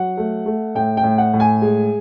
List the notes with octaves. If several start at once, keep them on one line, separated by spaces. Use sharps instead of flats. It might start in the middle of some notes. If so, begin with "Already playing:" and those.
Already playing: F#3 F#5
A3
A3
A2 G5
G5
A2
F#5
A2
G#5
G#3